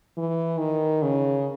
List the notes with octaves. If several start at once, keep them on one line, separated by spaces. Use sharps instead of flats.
E3
D#3
C#3